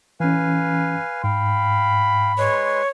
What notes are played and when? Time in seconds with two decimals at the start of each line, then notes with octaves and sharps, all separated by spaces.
0.20 E3 C#4 B4 F5 G#5
1.24 G#2 F5 G5 B5
2.38 G#3 B4 C#5 C6